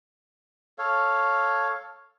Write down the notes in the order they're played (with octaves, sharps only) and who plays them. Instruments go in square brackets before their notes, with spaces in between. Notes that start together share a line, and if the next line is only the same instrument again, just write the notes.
[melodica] A4 C#5 F5